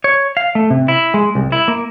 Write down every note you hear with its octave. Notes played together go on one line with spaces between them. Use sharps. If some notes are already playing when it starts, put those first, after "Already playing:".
C#5
F5
A3
C3
E4
G#3
C2
E4
A#3